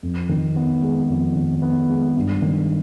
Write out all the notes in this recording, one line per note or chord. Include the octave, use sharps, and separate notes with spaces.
F2
D#3
B3
G#3
F2
D#3
B3
G#3
G2
D#3